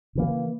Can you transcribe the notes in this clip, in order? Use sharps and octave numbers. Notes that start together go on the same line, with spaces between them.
C#3 E3 A#3